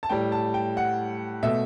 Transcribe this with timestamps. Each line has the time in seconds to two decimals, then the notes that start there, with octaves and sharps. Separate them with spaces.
0.03 A5
0.09 A2 G3 G5
0.32 A5
0.54 G5
0.77 F#5
1.43 B2 A3 E5